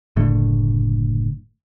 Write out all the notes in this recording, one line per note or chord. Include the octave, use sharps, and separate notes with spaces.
F#1 A2 D3 A3